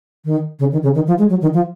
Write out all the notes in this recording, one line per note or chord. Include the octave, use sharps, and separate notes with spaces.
D#3
C#3
D#3
C#3
D#3
F3
G#3
F#3
D#3
F3